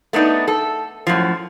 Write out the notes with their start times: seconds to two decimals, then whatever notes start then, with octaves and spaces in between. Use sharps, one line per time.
0.13 A3 B3 D4 D#4
0.48 A4
1.07 F#2 A2 F3